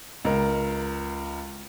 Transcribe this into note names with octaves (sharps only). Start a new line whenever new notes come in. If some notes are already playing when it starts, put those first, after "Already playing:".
C#2 A#4